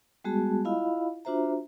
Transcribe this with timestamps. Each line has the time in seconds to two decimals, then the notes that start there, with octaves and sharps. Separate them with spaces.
0.24 G3 G#3 B3 F#4 G#4 A5
0.65 E4 F4 D#5 F5 B5
1.25 D4 F4 F#4 C5 E5 A#5